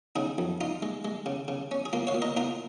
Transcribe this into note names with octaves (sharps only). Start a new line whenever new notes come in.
C#3 D#4 G#4
F2
D#4 F4
G#3
G#3
C#3
C#3
C#4
G#4
A#3 F4
C#5 F5
A#2
A#4 D#5
A#2 F4 A#4